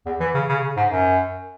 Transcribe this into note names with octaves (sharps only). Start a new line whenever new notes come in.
E2
E3
C#3
C#3
C#3
G#2
F#2